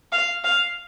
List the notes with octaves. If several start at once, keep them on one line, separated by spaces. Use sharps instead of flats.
F5
F5